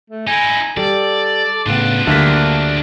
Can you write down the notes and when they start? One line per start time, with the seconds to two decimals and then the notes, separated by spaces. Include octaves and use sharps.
0.10 A3
0.27 D#4 E4 G#5
0.77 G3 A4 D5
1.66 A2 C#3 B3 D4 F4
2.07 D2 G3 A#3 B6